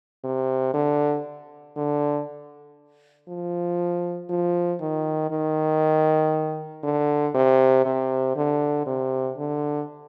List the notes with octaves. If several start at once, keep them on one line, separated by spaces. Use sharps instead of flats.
C3
D3
D3
F3
F3
D#3
D#3
D3
C3
C3
D3
C3
D3